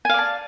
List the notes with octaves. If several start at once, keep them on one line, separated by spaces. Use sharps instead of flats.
D5 F5 G#5 A5